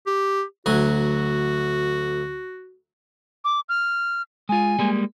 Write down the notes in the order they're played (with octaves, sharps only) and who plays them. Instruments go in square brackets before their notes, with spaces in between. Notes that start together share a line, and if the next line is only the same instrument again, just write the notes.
[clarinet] G4
[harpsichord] D2 F#3 G#5 [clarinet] F#4
[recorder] D6
F6
[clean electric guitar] G#3 F4 [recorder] G#5
[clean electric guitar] G3 G#3 A#3